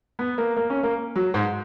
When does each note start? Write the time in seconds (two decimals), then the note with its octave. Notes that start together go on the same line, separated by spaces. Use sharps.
0.19 B3
0.38 A#3
0.57 A#3
0.70 C#4
0.83 A#3
1.15 F#3
1.34 G#2